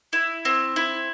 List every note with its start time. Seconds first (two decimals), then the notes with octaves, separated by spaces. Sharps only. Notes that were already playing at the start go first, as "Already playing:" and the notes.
0.13 E4
0.45 C4
0.76 E4